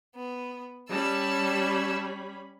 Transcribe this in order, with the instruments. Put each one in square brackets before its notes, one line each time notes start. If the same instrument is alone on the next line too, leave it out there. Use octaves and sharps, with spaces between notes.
[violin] B3
[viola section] G3 C#4 B5 [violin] A5 E6